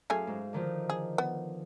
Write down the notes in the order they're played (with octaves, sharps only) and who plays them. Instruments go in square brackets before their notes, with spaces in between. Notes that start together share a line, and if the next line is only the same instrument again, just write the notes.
[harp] F#2 F5 [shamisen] A3 G#4 G#5
[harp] G#2
D3 D#3 F3
[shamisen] G#4
B3